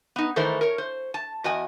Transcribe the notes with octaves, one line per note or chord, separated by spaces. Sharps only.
B3 D#4
D#3 E3 A3 A#4 C5
A#4 C#5
C5
A5
E2 F#4 D#5 G#5